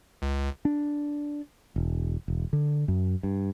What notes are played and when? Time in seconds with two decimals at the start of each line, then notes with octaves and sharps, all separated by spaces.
0.22 C#2
0.65 D4
1.76 E1
2.28 E1
2.53 D3
2.88 F#2
3.23 G2